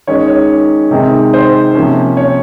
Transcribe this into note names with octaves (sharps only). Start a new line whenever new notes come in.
D#3 G#3 C#4 C#5
C#5
C3 D#3 G#3 C4
C5
C3 F3 A#3 C#4
C#5